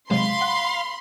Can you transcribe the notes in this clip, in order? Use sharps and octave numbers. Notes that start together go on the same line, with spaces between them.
C3 F#3 G#3 F5 B5 C6
F#5